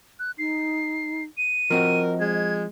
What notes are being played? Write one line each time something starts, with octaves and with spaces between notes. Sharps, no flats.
F#6
D#4 C7
D#7
F3 C4 F#4 A#4 D#5
G#3 G#6